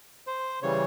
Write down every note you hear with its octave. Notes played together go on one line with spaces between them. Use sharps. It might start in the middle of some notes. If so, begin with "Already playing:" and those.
C5
C#3 E3 G3 C#5